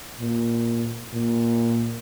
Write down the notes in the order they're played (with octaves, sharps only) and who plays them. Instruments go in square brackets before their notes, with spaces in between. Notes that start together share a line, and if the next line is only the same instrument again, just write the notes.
[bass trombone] A#2
A#2